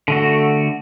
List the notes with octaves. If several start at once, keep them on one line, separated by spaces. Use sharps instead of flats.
D3 A3 F#4